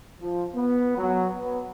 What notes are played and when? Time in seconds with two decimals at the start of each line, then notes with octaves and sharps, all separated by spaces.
0.20 F3
0.54 B3
0.97 F#3
1.38 B3